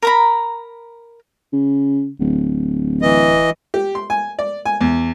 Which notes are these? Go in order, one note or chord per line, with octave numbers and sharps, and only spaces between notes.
A#4 A#5 B5
C#3
D1
E3 D#5
G4
C6
G#5
D5
G#5
E2